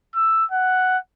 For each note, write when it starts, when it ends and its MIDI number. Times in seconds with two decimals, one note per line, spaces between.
0.15 0.45 88
0.52 0.98 78